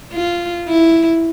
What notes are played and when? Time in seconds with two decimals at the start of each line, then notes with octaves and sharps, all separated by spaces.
0.13 F4
0.68 E4